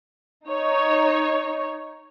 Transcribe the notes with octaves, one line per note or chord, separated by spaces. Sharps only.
D#4 C#5